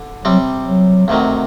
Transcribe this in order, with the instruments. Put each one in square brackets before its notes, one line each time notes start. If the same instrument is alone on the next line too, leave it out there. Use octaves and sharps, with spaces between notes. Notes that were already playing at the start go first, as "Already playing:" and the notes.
Already playing: [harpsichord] D3
[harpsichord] C3 G3 C4 [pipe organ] F#3
[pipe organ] F#3
[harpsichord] D2 C3 D#3 F#3